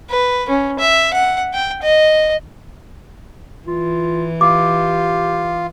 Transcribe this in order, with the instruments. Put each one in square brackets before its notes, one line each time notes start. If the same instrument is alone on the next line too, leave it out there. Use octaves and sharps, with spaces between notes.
[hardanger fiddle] B4
C#4
E5
F#5
G5
D#5
[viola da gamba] E3 [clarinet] F4
[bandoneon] F4 [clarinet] G4 [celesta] D6